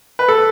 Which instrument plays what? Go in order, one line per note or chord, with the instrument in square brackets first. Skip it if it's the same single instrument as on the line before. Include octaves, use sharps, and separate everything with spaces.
[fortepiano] B4
A4